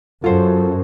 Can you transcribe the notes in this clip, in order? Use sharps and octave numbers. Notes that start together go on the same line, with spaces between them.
F#2 F#3 F4 A4 C5